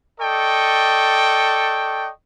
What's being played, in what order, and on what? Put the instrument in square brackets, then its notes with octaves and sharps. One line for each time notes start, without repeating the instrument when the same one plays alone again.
[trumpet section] A4 D5 D#5 G5 C#6